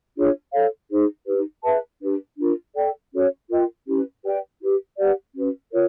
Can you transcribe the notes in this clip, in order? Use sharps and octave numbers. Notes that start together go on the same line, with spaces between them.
D4 F4 G#4 C#5
A4 C#5 F5
D#4 G#4 C5
D#4 G4 B4
G#4 B4 E5 A5
D4 G4 B4
D4 F4 A#4
A4 D5 G5
C#4 F#4 A4 C#5
F4 A#4 D#5 G5
C#4 E4 G4 B4
G4 B4 D5 G5
E4 G4 B4
G4 B4 D5 F#5
C#4 F#4 B4
F4 A#4 C#5